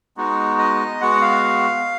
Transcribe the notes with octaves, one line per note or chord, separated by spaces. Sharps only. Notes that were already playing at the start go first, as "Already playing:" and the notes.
G#3 B3 D#4 F#4
D#5
G#3 B3 F#4 F#5
F5